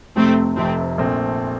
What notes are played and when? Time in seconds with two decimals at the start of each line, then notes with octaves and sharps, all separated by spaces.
0.16 F1 F2 C3 A3 C4
0.57 F1 F2 C3 A3 C4
0.98 A#1 A#2 A3 C4